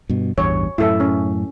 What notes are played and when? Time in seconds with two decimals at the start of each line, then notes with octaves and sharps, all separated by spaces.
0.09 G2 B2
0.38 A1 E2 G2 C#5
0.78 F#2 A2 E4 A4 E5
1.00 C#4